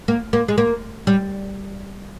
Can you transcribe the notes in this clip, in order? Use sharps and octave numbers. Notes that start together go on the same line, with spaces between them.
A#3
A#3
G#3
A#3
G3